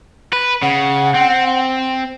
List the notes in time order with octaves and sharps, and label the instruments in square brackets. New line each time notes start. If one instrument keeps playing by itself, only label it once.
[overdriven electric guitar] B4
[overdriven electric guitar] C#3 [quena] F#5
[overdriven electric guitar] C4